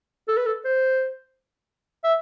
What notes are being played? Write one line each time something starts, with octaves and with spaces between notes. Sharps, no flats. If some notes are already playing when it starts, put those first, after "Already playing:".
A4
B4
A4
C5
E5